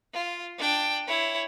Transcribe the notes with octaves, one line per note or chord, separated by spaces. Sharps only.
F4
D4 G5
E4 C#5